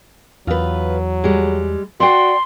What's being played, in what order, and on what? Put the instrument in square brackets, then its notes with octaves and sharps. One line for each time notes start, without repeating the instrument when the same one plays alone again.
[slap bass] E2 [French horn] F#3 [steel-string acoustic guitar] F4 B4
[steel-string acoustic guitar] G3 G#3
[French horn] F#4 [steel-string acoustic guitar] D5 F#5 G5 [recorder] C6